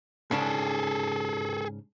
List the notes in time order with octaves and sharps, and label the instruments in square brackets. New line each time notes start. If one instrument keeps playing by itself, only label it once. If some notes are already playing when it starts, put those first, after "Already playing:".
[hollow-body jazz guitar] G#2 C#3 D4 [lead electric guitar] G#4 A4